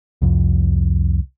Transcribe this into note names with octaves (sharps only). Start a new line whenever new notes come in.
C2 F2